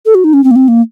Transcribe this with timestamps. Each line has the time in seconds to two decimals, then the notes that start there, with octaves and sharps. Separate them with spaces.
0.06 A4
0.15 F#4
0.24 D#4
0.33 C#4
0.44 C4
0.51 A#3
0.56 C4
0.68 A#3